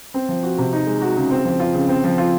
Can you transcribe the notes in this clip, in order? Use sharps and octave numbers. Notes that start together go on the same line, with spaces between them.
C4
F3
F#4
C3
D#4
G#3
F#4
C#3
C4
F3
F4
C#3
C4
F3
F4